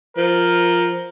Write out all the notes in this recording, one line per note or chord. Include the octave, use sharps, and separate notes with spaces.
F3 A#4